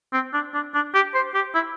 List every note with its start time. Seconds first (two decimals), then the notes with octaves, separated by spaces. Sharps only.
0.13 C4
0.33 D4
0.54 D4
0.74 D4
0.94 G4
1.14 C5
1.34 G4
1.55 E4